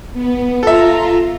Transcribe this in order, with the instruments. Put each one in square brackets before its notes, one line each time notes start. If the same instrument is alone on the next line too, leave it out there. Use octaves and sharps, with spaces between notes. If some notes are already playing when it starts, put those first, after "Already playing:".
[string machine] B3
[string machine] F4 A#5 [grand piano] A4 E5